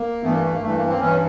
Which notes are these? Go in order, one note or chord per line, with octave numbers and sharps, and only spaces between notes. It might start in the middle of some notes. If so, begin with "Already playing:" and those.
Already playing: A#3
G2 E3 A3 B3
A#3
A3
A#3
G2 E3 A3
A#3
A#3 C4
G2 E3 B3 C#4